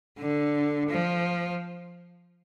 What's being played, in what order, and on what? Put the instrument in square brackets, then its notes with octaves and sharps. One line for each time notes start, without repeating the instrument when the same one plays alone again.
[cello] D3
F3